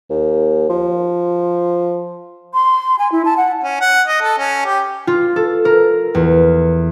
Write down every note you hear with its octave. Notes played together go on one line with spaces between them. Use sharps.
D#2
F3
C6
G#5
E4
A5
F#5
C#4
F#5
D#5
A4
C#4
G4
F4
A4
A#4
E2